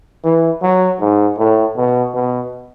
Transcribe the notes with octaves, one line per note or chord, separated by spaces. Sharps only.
E3
F#3
G#2
A2
B2
B2